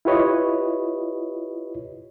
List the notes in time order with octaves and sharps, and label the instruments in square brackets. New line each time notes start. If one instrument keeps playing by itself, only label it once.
[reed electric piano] E4 F4 G4 B4 C#5 D#5